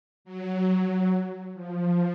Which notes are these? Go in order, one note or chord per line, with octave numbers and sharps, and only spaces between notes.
F#3
F3